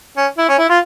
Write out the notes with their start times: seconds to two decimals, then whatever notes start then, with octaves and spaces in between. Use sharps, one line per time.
0.17 C#4
0.38 E4
0.48 C#4
0.58 E4
0.69 F4